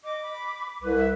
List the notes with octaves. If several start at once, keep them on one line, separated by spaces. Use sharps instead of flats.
D#5 D6
B5
C2 B4
E5